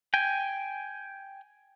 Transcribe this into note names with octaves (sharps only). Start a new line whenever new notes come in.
G5 G#5